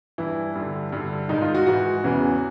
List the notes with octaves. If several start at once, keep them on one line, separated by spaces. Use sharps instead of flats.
G2 E3 E4
G2 D3
G2 D3
G#2 D#3 D#4
F4
F#4
G#2 E3 F#4
E2 C#3 E3